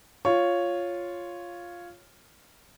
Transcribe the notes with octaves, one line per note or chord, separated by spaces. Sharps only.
F4 C#5